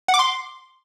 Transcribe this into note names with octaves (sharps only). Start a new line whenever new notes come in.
F#5
D6
C6